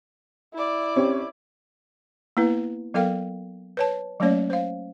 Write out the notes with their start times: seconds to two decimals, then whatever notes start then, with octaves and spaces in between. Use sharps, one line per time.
0.54 E4 D5
0.96 C4 C#4 G4
2.37 A#3 B3 E4 B4
2.94 F#3 B3 A4 A#4 F5 G5
3.77 B4 C#5 A5
4.20 F#3 A3 A#3 C#4 C#5 D5
4.50 C5 F5